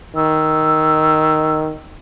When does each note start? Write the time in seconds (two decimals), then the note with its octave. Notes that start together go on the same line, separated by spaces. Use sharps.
0.16 D#3 E6